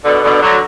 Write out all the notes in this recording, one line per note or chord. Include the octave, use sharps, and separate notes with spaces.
B2 D3
B2 D3
D3 F#3